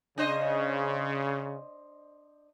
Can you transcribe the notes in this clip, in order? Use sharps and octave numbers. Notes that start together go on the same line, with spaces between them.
C#3 D4 C5 D#5